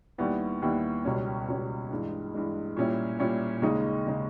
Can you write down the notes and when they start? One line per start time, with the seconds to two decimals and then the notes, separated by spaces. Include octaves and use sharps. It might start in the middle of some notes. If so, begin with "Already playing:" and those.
0.18 D#2 D#3 G3 B3 E4
0.62 D#2 D#3 G3 B3 E4
1.05 C#2 B2 G3 C#4
1.48 C#2 B2 G3 C#4
1.91 G2 E3 G#3
2.34 G2 E3 G#3
2.77 A#2 G3 C#4 E4
3.19 A#2 G3 C#4 E4
3.62 D#2 C#3 G#3 D#4
4.07 C#3 G#3 D#4